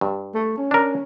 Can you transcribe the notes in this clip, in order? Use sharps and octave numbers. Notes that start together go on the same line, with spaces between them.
G2
A3
C#4
D4 A#4